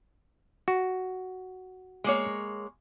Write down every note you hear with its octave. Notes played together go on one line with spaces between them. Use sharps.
F#4
G#3 A#3 C#5